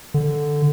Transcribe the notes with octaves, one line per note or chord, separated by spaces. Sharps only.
D3